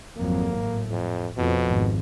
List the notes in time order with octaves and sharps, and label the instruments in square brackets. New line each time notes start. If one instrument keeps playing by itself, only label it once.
[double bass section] G#1 F2 F#3 [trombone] A#3
[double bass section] A2
[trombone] F2
[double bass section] F2 F3 [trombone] B2
[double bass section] G#1